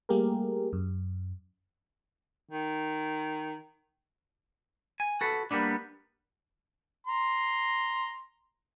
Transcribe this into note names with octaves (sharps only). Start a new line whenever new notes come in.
G3 A3 A#3 G4 G#4 A#4
F#2
D#3
G#5
F#4 A4 B4
G3 A#3 B3 D4
A#5 C6